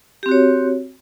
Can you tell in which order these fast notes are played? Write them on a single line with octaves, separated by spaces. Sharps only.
G4 C4 F#4 C#5